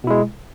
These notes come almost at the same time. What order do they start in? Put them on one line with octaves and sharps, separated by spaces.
B2 E4 G#3